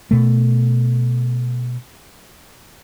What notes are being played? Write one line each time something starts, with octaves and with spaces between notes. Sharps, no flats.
B2 A3